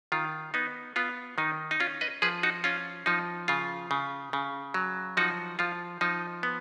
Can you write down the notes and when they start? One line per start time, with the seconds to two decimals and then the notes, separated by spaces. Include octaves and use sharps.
0.12 D#3 F4
0.54 B3 D#4
0.96 B3 F4
1.38 D#3 D#4
1.71 D#4
1.80 C#4 F4
2.01 B4 D#5
2.22 F3 G#4 B4
2.43 D#4 F#4
2.64 C#4 F4
3.06 F3 D#4
3.48 C#3 F4
3.91 C#3
4.33 C#3
4.74 F#3
5.17 F3 D#4 F#4
5.59 F3 F4
6.01 F3 D#4
6.43 B3